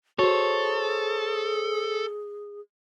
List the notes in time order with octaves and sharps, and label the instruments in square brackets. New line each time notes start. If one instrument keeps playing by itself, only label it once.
[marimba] F#4 [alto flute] G#4 [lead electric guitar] A4 [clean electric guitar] C5 C#5